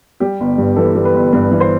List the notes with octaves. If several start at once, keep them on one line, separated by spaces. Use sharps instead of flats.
G3 G4
G1
G2
E3 A4
G3
B4
G1
G2 B4
E3
C5